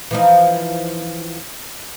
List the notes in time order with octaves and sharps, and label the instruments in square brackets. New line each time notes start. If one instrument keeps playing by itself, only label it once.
[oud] E3 F3 D#4